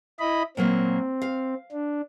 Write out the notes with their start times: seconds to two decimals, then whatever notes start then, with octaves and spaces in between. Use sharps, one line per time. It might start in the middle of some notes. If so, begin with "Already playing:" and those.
0.20 E4 D#5 B5
0.57 A#2 F#3 A#3 C4
1.22 F5
1.72 D4